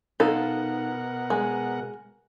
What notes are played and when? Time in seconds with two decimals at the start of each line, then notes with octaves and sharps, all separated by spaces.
0.20 B2 D#4 F4 A4 A#4 F#5
1.30 G#3